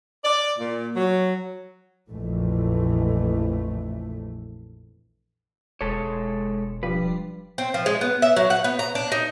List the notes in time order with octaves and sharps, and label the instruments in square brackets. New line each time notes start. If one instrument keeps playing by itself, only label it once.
[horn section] D5
A#2
F#3
[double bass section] A#1 F2 E3 A3
[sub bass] E1 [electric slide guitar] G#3 A4 C#5
[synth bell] F3 G3 D4 [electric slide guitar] B4
[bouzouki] C4
F3
G#3
B3
E5
F#3
F#5
B3
A#5
D4
D#4